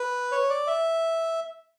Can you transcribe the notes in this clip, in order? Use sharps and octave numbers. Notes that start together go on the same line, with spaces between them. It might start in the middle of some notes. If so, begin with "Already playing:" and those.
Already playing: B4
C#5
D5
E5